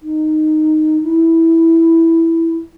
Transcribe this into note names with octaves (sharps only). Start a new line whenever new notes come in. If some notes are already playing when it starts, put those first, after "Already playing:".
D#4
E4